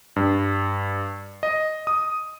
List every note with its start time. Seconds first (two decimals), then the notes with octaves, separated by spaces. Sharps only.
0.16 G2
1.43 D#5
1.87 D#6